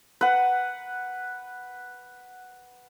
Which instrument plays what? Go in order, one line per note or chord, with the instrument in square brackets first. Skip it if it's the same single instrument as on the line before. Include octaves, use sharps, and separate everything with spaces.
[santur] B4 F#5